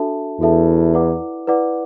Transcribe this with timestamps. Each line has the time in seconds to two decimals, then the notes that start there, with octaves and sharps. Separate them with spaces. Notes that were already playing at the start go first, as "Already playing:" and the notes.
Already playing: D4 F#4 A4 E5 A5
0.40 E2 D4 F#4 A4 E5 A5
0.94 E4 B4 D5 F#5 D6
1.47 E4 B4 D5 F#5 D6